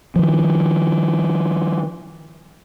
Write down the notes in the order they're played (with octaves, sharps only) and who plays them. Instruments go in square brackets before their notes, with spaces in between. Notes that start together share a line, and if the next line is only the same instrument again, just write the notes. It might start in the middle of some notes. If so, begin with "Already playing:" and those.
[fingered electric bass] D#3 F3